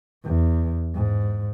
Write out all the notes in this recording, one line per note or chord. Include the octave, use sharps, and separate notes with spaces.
E2
G#2